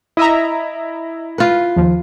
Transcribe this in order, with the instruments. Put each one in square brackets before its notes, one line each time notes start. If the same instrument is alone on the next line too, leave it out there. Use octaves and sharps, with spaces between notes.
[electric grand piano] E4 [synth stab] D#5 E5 A#5
[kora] F4 B4
[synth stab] D#2 F3